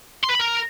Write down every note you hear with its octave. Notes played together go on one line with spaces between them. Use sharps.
C6
B4
B5
A#4